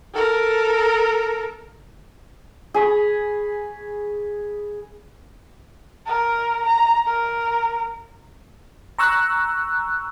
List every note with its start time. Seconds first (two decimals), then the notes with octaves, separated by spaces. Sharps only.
0.14 A4 A#4
2.74 G#4 B5 C#6
6.06 A#4
6.66 A#5
7.06 A#4
8.99 A#5 C#6 E6 F#6